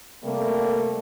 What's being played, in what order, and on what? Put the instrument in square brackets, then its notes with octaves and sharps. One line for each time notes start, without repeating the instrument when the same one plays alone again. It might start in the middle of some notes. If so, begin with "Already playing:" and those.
[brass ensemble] C3 G3 A3 A#3